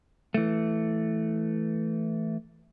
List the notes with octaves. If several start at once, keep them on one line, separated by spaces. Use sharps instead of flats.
E3 A3